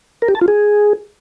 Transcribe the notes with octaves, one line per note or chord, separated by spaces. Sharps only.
A#4
G4
A5
F4
G#4